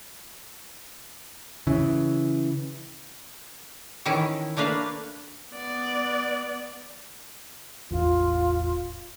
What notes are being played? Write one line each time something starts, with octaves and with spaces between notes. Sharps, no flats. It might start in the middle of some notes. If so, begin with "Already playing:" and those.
C#3 E3
D#3 E3 C#4 E4
A3 A#3 D4 B4 F5
B3 D5
E1 A1 E2 F4